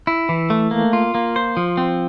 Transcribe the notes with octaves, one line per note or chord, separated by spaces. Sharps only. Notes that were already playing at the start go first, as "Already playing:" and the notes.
E4
E3
A3
A#3
F4
A#3
C5
F3
C4